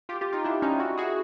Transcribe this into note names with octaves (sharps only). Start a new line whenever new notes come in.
F4 G4
F4 G4
D#4 F4
D4 E4
C#4 D#4
E4 F#4
F#4 G#4